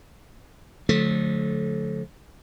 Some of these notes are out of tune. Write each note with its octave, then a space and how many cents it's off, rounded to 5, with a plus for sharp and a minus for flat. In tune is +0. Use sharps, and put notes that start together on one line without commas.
D3 -25 F3 +35 A3 -20